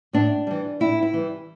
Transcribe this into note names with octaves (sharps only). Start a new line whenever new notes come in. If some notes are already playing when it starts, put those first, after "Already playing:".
A2 D4
E3 G3
A2 E4
E4
E3 G3